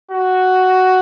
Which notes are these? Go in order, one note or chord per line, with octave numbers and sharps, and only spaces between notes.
F#4